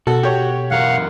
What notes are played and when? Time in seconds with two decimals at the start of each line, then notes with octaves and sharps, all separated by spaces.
0.07 B2 F#4 A4
0.23 G4 C#5
0.71 F#2 E3 A#4 F5 F#5